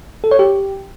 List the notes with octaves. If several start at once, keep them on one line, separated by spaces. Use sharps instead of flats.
A4
C#5
G4